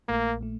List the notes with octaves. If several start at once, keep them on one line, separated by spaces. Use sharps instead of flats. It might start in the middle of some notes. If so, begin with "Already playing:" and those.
A#1 A#2 A3 A#3
A#2 A3